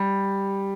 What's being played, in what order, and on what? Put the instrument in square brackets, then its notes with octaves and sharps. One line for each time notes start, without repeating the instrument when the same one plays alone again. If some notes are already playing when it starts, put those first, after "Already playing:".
Already playing: [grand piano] G3